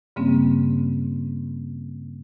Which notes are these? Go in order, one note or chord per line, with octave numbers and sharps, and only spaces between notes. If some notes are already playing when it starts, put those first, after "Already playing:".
G2 C#3 G3 A#3 C4 C#4